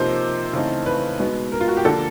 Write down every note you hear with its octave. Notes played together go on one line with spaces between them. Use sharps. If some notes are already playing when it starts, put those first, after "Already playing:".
Already playing: C3 F3 A#3 D#4 C5
C#3 E3 A3 C4 D#4
B4
B2 G#3 B3 D#4
A#4
F4
F#4
G4
D3 F3 A#3 A4